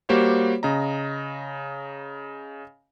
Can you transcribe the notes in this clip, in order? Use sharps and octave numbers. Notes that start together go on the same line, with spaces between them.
G3 A#3 F#4 G4 C5 C#5
C#3 D#5 A#5